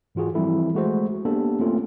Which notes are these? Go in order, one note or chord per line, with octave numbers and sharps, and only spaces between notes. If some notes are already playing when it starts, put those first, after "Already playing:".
G#2 E3 F4 F#4 G#4
E3 F3 G3 C4 E4 A4
G#3 A3 F#4 G#4 C5
A#3 B3 D4 G4 A4
A3 A#3 C4 C#4 F4 A4